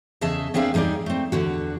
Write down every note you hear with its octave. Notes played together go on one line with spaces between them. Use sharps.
E2 C#3 G#4 D#5 E5 A5
A#3 C4 D4 G#4 E5 F5
E2 G3 D#4 G#4 D5
A3 C4
E2 D3 F#4